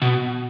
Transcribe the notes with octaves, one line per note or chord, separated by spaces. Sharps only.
B2